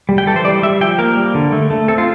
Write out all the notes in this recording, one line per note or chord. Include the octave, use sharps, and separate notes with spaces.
G3
G5
E3 A4
C5
G3 D5
G3 E5
F3 G5
A#3 A#4
G3
D3
A3
A3
C4 A4
F4